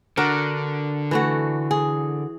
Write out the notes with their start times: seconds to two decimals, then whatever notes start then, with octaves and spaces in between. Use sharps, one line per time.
0.17 D3 D4 F#4 A#4
1.11 E3 A3 F#4
1.71 G#4